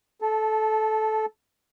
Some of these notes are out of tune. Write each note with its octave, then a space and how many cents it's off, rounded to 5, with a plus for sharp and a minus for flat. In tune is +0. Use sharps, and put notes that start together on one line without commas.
A4 -15 A5 +0